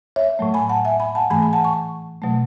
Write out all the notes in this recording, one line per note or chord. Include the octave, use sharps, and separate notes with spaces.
C#5 E5
A2 F#3 A3
G#5 B5
F#5 A5
E5 G#5
G#5 B5
F#5 A5
G#2 E3 A3 G#5 B5
G#5 B5
F#5 A5
A5 C#6
B2 F#3 A3